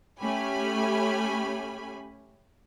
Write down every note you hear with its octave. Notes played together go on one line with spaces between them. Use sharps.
A3 C#4 G4 G#5 B5